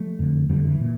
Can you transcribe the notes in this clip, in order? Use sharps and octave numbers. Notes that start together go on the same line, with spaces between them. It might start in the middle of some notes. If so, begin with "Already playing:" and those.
Already playing: F3 A3
F2 D3
F2 D3 E3 G3
E3
A#2